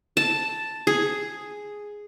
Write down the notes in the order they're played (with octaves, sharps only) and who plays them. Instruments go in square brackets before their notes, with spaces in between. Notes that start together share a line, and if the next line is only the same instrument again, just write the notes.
[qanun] A5
G#4